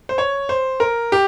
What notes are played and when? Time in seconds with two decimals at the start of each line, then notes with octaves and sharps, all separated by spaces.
0.09 C5
0.18 C#5
0.49 C5
0.80 A#4
1.12 G4